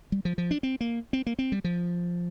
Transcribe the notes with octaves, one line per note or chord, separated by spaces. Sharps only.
G3
F3
F3
D4
C4
A#3
C4
A#3
C4
G3
F3